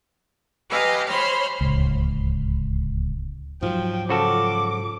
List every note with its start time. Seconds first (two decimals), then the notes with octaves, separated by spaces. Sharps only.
0.70 G4 B4 D#5 F5 G#5 A#5
1.08 C5 C#5 B5 C6 F6
1.61 D1 C#2
3.63 G#2 F3 F#3 G5
4.09 C#3 F3 F#4 A4 D6